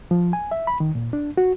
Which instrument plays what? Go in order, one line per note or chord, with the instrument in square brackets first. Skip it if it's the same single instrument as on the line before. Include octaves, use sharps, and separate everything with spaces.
[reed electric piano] F3
G#5
E5
B5
D#3
A#2
D4
F#4